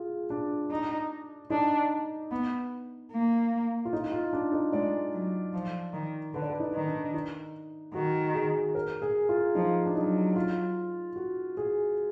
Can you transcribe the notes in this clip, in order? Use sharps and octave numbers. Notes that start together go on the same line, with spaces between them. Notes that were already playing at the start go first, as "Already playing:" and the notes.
Already playing: F4 G#4
D4
D#4
D4 D#4
B3
A#3
F4
D#4
F4
D4
D#4
G#3 D5
F#3
F3
D#3
D3 B4
D5
B4
D#4
D#3
D4
D#4
D#3 F#4
G#4
A#4
G#4
F4
F3 D#4
D4
F#3 D#4
F4
F#4
G#4